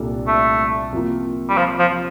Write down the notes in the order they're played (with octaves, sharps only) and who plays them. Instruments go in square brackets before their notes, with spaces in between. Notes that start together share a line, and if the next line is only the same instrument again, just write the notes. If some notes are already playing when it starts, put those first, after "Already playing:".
Already playing: [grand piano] C2 A#2 G3 D4 A4
[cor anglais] A3
[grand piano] C3 F3 A#3 F4
[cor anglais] G3
F3
F3